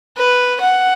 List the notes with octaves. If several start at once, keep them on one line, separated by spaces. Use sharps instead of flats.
B4
F#5